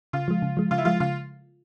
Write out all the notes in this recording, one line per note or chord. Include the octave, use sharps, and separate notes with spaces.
C#3 F4
F3 G#3
C#3
F3 G#3
C#3 F4
E4
F3 G#3 F4
C#3 F4